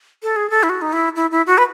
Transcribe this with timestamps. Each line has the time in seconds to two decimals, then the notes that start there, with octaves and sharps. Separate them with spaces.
0.23 A4
0.36 G#4
0.50 A4
0.63 E4
0.69 F#4
0.81 D#4
0.93 E4
1.16 E4
1.31 E4
1.46 F#4
1.58 B4